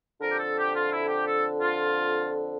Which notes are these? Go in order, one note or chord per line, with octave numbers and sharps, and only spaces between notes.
F2 D3 A#4
G4
A4
G4
F4
E4
G4
A4
F4